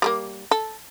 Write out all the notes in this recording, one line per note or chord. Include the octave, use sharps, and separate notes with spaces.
G3 A3 A#3
A4